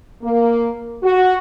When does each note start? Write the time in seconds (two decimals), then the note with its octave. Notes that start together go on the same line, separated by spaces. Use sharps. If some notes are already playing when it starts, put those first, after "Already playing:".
0.21 A#3
1.02 F#4